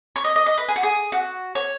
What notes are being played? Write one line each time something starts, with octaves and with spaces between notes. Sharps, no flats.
C#5
D#5
D#5
D#5
B4
G#4
F#4
G#4
F#4
C#5